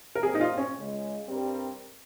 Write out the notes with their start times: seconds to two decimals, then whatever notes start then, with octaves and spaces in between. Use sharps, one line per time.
0.15 A#4
0.22 A#2 G3 C4 G#4
0.35 D#4
0.41 F4
0.58 C#4
0.75 C#2 C#3 G#3
1.27 G2 G3 C4 G4 A#4